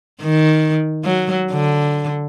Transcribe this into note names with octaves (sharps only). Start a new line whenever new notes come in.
D#3
F#3
D3